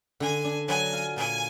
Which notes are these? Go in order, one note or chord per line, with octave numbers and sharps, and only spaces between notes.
D3 G#5
D4
F#3 G#5
F4
A#2 G#5